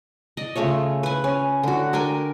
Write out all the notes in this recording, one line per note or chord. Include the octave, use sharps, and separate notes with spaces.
D5 D#5
C#3 A3 F4 C#5
B4 G#5
C#4
D3 F#4
D4 A#4 G5 G#5